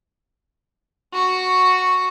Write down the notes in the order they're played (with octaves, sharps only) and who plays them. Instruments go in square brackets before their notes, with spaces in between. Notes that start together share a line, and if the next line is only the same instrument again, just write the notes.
[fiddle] F#4 C#6